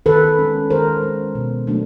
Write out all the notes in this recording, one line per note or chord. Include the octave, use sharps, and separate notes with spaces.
D#3 A4 B4
G#3 C#4
D#3 A#4 C5
G#3 C#4
B2
F#3 A3 D4